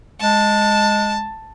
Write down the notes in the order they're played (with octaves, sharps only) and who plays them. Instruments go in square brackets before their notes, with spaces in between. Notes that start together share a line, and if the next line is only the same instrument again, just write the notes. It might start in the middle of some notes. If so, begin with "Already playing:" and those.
[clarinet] G#3 [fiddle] A5